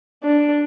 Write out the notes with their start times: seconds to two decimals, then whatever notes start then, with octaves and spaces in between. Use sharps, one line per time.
0.23 D4